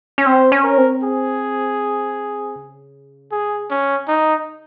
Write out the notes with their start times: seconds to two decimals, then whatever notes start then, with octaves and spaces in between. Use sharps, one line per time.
0.18 C#4
0.26 C4 C5
0.52 C#4
0.64 A#4
0.78 C4
1.03 G#4
2.56 C#3
3.32 G#4
3.71 C#4
4.08 D#4